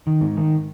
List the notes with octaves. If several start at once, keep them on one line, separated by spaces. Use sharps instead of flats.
D#3
G#2
D#3